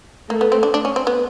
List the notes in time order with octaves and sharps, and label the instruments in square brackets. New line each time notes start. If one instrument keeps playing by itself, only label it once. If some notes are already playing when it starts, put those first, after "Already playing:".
[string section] A3 [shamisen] A#3
[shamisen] B3
C4
D4
D4
C#4
C4
B3